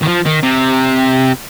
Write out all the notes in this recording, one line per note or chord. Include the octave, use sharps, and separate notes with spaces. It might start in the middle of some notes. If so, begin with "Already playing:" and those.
D#3
F3
D#3
C3